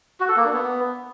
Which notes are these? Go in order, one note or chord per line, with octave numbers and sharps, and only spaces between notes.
F#4
A4
A#3
D4
B3